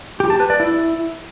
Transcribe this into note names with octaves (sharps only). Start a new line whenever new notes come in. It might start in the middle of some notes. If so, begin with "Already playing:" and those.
G4
A5
B4
D5
E4